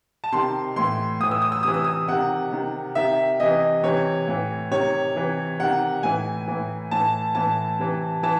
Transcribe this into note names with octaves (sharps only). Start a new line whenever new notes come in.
A5
C3 D#3 C6
A2 E3 C6
A2 E3 D#6
E6
D#6
E6
C3 E3 D#6
E6
D#6
C3 D#3 F#5
C3 D#3
C3 D#3 E5
C3 E3 D#5
C3 E3 C#5
A2 E3
C3 D#3 C#5
C3 E3
C3 D#3 F#5
A2 E3 G#5
A2 E3
A2 E3 A5
A2 E3 A5
C3 E3
E3 A5